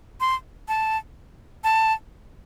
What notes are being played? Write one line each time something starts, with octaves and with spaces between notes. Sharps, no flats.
C6
A5
A5